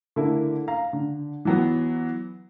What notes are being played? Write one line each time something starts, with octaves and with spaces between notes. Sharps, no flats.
D3 A3 A#3 E4
F5 A#5
D3
E3 F#3 B3